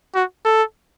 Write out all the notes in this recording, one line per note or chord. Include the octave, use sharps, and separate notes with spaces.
F#4
A4